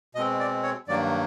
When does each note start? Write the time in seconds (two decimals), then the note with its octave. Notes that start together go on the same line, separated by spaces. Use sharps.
0.15 B2 G#3 C4 D#5
0.39 D5
0.63 C#5
0.88 G2 D#3 F#3 A#3 D5